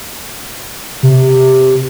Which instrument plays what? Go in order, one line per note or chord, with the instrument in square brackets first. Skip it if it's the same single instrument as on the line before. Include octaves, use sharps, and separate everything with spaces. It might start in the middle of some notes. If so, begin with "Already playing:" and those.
[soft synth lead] C3